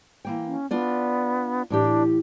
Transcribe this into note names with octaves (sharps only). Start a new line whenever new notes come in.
E3 A#3 G5
C#4
B3 D4 F4 D5
A2 E3 D4 G4